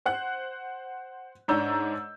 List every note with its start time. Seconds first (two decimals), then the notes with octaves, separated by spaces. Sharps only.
0.05 C5 F#5 F#6
1.48 G#2 D4 C#5 A#5 E6 G6